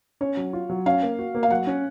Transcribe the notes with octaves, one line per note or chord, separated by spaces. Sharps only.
C#4 C#5
F#3
F4
F#3
C#4 F5
A#3
F#4
A#3
F5
F#3 F#5
C#4